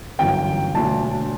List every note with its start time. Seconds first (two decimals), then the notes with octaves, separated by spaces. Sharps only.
0.19 G1 F#2 E3 G5
0.75 E1 D2 D3 A5